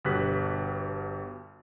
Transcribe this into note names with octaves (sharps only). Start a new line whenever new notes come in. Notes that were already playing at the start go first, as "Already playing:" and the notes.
G1 B2 G4 F#6 B6